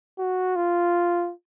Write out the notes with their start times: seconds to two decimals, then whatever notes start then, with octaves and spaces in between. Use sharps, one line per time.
0.19 F#4
0.56 F4